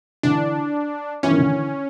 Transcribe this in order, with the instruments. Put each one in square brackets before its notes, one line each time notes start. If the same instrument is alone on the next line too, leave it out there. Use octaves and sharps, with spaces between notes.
[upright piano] D3 E3 [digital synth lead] D4
[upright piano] E3 [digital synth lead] C#4
[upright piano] D#3
D3 E3